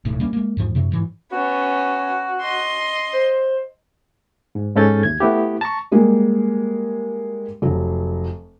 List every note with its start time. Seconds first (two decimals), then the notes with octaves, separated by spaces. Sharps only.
0.05 D1 B1 A2
0.20 G3 A#3 C#4
0.33 G#3 A#3
0.57 E2 G#2 F3
0.75 F#2 C3 F#3
0.92 G#2 E3 F#3
1.32 B3 C#4 F#4
2.42 D#5 C6
3.14 C5
4.55 G#2
4.76 G#2 G#3 C#4 A4 G6 A6
5.03 D#2 G#6
5.20 A3 B3 E4 G4
5.61 A5 A#5 C#6
5.92 G3 G#3 A#3
7.62 F1 F#3